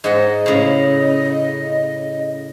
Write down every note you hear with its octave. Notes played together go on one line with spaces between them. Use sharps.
G#2 D#5 F#5
A2 C#3